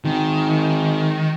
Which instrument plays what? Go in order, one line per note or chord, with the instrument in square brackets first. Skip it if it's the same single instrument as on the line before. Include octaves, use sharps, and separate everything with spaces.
[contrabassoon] G#1 [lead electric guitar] D#3